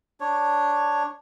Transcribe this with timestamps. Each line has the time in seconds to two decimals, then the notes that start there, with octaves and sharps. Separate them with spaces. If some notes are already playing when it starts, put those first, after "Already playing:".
0.20 D4 C#5